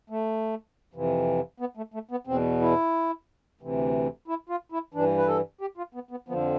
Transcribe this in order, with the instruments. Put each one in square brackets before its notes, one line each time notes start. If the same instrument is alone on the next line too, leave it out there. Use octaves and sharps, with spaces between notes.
[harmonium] A3
F2 C3 E3
B3
A3
A3
B3
E2 B2 C4
E4
D2 C3 E3
E4
F4
E4
G2 E3 D4
B4
A4
G4
F4
B3
B3
F2 D3 F3 B3